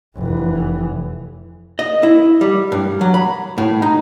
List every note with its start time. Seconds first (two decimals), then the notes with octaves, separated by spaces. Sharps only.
0.16 F1 E3
1.79 D#5
2.03 E4
2.41 G3
2.72 G2
3.01 F#3
3.14 B5
3.58 A2
3.82 D#4